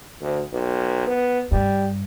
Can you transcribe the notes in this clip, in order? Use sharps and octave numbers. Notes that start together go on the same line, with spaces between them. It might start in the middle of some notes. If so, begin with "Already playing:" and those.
D2
B1
B3
G2 G3